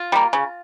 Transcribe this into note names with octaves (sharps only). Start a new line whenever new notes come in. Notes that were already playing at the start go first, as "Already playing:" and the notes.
Already playing: F4
G3 A#3
C#3